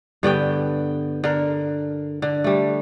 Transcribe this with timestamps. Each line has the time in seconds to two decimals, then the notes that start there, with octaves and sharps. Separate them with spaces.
0.23 G2 D3 B3 G5
1.24 D3 A#4
2.22 D3
2.44 G3 A3